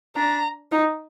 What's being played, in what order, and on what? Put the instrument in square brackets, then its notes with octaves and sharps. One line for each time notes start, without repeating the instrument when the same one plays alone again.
[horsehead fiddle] D4 [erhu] A#5
[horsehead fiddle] D#4